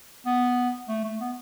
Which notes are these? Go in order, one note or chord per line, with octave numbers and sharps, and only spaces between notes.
B3
A3
A3
B3